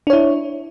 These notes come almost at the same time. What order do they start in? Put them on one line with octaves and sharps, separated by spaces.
D4 C#5 E4